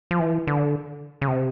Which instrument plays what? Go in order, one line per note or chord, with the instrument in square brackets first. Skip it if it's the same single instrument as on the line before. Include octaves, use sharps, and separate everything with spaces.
[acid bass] F3
E3
D3
C#3
C3